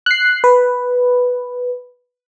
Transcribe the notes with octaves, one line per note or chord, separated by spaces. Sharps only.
F#6 C7
B4